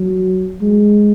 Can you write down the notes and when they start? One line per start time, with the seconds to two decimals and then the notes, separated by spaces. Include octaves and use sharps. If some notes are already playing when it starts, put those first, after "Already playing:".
Already playing: F#3
0.61 G#3